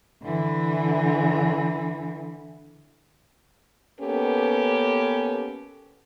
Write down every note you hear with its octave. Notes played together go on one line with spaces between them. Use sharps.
D3 E3
A#3 B3 C#4 G4 A4 B4